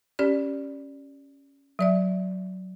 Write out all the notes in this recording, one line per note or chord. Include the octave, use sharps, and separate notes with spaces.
C#4 G4 D5
F#3 D5 E5